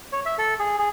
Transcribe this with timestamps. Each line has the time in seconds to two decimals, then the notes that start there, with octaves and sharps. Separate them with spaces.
0.12 C#5
0.26 E5
0.38 A4
0.59 G#4
0.78 G#4